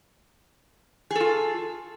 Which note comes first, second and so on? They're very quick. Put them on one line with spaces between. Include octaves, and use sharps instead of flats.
G#4 A4 F4